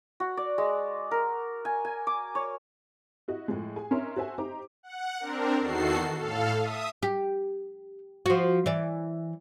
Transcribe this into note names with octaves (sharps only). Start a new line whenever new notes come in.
F#4
D5
G#3
A#4
G#5
G#5
D6
C#5
E4 F#4 D#5
A2 F3 G#3
G#4 G#5
C#4 D#4 A#4 C#5 E5 C6
F#4 A4 C5 E5 G#5
D#4 G4 C5 A#5 D6
F#5
C4 D4 A#4
E2 D#3 F#4 A4 C7
A2 A4 F5
E5 D#6
G4
F3 F#4
E3 D5